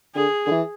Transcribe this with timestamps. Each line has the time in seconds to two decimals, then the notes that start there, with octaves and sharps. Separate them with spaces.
0.15 D3 G#4
0.47 D3
0.51 E3